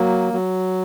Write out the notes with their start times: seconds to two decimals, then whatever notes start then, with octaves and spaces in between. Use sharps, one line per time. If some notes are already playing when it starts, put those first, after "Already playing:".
Already playing: F#3 A#3
0.33 F#3